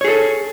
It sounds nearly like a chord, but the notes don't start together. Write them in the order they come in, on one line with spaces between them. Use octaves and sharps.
C#5 G#4 A4